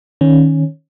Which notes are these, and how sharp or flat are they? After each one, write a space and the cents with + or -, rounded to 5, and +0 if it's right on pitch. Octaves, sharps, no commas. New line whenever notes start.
D#3 +0 C#4 -10